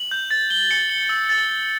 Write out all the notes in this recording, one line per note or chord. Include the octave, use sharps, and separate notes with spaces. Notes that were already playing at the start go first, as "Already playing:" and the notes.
Already playing: F#7
G6
A6
G7
C#7
G7
E6
A6
A6